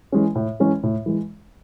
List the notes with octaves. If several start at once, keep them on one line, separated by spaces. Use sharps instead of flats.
E3 G#3 C#4
A2
E3 G#3 C#4
A2
E3 G#3